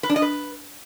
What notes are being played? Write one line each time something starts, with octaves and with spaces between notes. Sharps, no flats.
B4
D4
D#5
B4